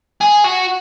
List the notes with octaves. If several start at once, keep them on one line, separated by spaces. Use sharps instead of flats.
G#4
F#4